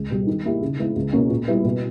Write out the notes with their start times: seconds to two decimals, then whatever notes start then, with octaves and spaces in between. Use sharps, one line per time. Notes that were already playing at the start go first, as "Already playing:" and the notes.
Already playing: C#2
0.10 B2 G3
0.27 D#3
0.45 A#3 E4 G4
0.62 C#3
0.79 G#3 B3 E4
0.96 C#2
1.13 B2 A#3 C#4
1.30 A#2
1.48 G3 B3 E4
1.64 B2